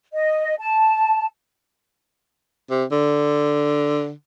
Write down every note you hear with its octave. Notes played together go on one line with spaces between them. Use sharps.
D#5
A5
C3
D3